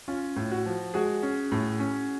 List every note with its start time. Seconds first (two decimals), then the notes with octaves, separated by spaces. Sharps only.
0.08 C#4 F4
0.36 A2
0.51 F#4
0.66 F3
0.94 G#3 F#4 G#4
1.22 C#4
1.52 A2
1.79 C#4